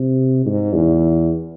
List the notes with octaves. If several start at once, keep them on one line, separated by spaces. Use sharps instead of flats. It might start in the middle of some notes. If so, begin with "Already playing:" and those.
Already playing: C3
G#2
E2